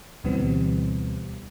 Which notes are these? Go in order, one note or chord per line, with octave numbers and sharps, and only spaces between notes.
D2 B2 E3 G3 B3 C4